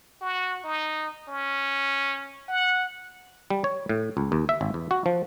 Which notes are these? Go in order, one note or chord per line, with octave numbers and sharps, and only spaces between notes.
F#4
D#4
C#4
F#5
G3
C#5
A2
C#2
D#2
E5
G#1
E2
F#4
F3